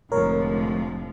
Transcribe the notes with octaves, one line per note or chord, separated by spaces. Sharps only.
F1 A2 D3 F3 G#3 A#4 C#5